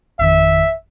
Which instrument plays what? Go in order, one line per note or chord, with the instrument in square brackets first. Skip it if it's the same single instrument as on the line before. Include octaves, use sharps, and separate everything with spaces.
[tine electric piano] G#1 F2 D#3 [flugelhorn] E5